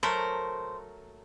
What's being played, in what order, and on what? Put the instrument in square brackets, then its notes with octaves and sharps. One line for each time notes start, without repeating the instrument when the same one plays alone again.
[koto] F#3 A3 A#4 [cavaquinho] C5